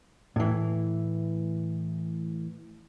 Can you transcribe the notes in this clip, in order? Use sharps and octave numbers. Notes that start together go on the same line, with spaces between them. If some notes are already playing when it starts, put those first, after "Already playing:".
A2 E3